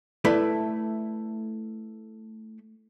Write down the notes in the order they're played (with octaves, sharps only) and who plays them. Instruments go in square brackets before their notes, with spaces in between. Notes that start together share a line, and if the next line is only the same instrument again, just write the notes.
[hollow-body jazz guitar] A3 E4 A4 B4 D5